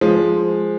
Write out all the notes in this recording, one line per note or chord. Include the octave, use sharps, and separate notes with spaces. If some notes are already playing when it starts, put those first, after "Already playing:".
F3 G#3